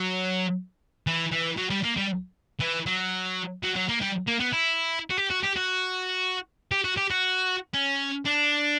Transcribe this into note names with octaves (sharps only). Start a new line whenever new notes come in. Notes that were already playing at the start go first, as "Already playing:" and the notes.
Already playing: F#3
E3
E3
F#3
G3
A#3
G3
E3
F#3
F#3
F#3
A#3
G3
A#3
B3
E4
F#4
G4
F#4
G4
F#4
G4
F#4
G4
F#4
C#4
D4